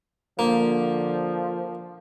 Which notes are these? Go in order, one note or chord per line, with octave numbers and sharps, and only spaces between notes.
D3 F3 A#3